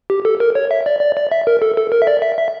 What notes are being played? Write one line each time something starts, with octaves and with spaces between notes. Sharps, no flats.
G4
A4
A#4
C#5
E5
D5
D5
D5
E5
A#4
A4
A4
A#4
E5
D5
E5
E5